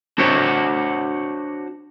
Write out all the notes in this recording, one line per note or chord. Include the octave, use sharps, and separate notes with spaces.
D4 F#4 C5 C#5